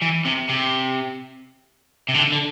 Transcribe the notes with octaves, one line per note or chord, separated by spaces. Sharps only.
E3
C3
C3
C3
D3
D3